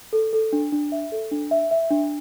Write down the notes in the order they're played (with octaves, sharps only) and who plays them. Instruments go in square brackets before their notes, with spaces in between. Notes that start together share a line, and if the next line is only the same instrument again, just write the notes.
[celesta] A4
A4
D4
D4
E5
A4
D4
E5
E5
D4